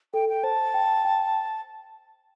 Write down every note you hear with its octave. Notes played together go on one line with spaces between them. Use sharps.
A4 G5
G5
C5 A5
G5
G5